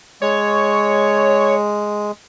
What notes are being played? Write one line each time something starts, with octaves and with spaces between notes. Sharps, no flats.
G#3 C#5